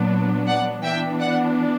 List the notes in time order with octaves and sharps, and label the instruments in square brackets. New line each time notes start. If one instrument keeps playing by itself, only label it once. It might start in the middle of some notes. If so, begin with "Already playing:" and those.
Already playing: [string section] A#2 F#3 B3 D4
D5 F#5
E3 B3 D4 E5 G5
D5 F#5